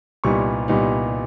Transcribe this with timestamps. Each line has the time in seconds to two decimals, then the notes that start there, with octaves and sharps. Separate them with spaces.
0.24 C2 A#2 G3 B3 D#4 C#6
0.68 C2 A#2 G3 B3 D#4